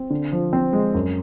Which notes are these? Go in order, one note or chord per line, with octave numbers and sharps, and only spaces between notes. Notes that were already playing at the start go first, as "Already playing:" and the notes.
Already playing: C4
D3
F3
C4
G#3
F#2